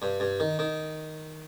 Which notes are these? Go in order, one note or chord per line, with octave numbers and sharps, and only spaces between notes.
G2
G2
D#3
D#3